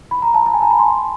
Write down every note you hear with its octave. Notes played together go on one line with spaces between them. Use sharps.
B5
A#5
A5
A5
G#5
A#5
B5
C6